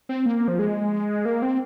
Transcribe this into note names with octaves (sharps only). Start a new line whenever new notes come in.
C4
A#3
F3
G#3
A#3
C4